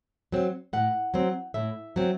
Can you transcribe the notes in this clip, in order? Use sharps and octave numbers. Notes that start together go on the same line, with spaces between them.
F#3 C4
A2 F#5
F#3 C4
A2 E5
F#3 C4